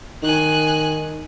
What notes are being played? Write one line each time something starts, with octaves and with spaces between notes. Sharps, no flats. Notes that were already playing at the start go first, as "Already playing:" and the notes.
D#3 G#5 F#6